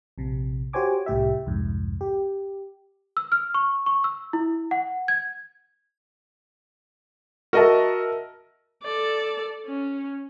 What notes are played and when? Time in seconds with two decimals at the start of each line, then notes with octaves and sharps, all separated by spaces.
0.18 A#1 C3
0.73 F#4 G4 C5 C#5 G#5 D6
1.06 C2 A2 G4 E5
1.46 C2 F2 G#2
2.01 G4
3.17 E6
3.32 F6
3.54 C#6
3.86 C#6
4.04 E6
4.33 E4
4.71 F#5
5.08 G#6
7.53 F#4 A#4 D#5 E5 A5
8.84 A4 D5
9.66 C#4